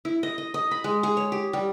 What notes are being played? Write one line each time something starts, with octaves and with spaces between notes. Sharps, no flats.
E4
D#5
D#5
D#5
B5
G#3
G#4
C#5
G4
G3